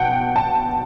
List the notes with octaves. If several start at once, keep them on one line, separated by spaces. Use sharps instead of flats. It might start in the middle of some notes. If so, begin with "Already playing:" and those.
Already playing: B2 F#5 G5 A5
A5